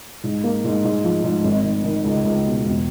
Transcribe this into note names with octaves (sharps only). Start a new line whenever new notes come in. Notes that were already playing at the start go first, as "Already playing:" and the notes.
G#2
A#3
G#2
G#2
F3
G#2
G#1
D#3
D#3
C#2
C#2
B2
E1